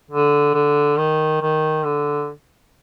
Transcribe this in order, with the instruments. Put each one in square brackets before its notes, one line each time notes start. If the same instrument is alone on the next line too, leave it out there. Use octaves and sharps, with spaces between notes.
[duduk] D3
D3
D#3
D#3
D3